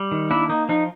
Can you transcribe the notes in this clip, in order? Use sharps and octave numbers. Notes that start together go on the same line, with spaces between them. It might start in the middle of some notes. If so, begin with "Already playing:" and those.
Already playing: G3
D#3
A#3 D4 E4
A#3 D#4
F3 D#4